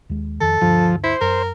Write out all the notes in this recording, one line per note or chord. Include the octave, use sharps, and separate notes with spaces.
D#2 G#3
F2 D#3 A4
D2 G2 F3 D4
E4 C5
F#2 A#4